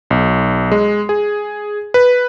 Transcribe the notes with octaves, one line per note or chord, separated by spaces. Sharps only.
B1
G#3
G#4
B4